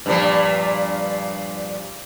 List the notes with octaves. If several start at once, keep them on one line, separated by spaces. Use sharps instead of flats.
G2 A#2 F3